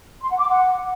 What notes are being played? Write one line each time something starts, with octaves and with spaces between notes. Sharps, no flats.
C6
F#5
D6
F#5